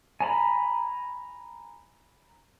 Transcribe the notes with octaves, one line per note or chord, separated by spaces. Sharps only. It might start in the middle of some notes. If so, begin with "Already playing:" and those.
G#5 A#5 B5